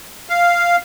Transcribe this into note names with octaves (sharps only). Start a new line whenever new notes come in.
F5